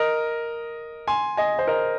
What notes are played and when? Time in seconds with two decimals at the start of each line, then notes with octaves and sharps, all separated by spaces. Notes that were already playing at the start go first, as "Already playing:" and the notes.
Already playing: A#4 D#5
1.08 G#5 C6
1.37 D#5 G#5
1.59 C5
1.68 A#4 D#5